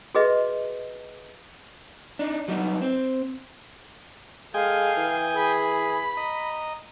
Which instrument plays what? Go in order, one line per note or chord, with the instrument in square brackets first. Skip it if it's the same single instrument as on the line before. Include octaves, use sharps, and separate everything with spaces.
[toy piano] F#4 G#4 B4 D#5 E5
[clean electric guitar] D4 D#4
F#3 G3 B3 D#4
C4
[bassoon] G#3 [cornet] A4 [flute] F5 [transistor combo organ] G5 G#5 D#6
[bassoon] E3
[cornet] G#4 [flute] B5
[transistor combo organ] D#5 [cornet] A#5